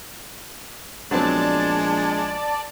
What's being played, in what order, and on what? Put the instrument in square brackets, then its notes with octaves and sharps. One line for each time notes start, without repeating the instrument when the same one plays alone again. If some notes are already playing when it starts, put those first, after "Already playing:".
[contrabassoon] A#1 [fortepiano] F#3 B3 C4 [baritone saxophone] G#3 [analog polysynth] D5 A5